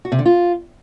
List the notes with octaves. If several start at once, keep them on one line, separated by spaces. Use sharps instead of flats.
F#4
C3
D3
F4